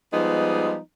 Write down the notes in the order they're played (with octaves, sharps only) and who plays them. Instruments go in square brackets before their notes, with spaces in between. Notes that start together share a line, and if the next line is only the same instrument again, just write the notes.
[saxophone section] F3 G3 G#3 B3 D#4